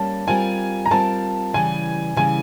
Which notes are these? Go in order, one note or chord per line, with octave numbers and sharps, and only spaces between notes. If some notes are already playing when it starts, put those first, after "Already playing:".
Already playing: G3 A#3 C#4 A5
G3 C4 F4 A#4 G#5
A#5
G3 C4 F4 A#4 A5
C#3 E3 G3 G#5
C#3 E3 G3 G#5